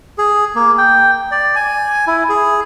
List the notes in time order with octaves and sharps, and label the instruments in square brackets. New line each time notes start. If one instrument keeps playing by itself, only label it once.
[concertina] G#4
A#3
G5
D5
G#5
E4
G#4